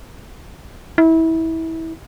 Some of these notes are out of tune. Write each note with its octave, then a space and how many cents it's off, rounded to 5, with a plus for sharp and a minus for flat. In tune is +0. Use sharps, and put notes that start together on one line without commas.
E4 -25